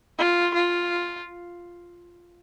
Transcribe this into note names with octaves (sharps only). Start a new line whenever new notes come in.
F4
F4